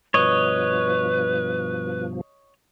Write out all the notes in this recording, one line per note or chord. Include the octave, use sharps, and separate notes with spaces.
G2 B2 F3 B4 C#5 D#5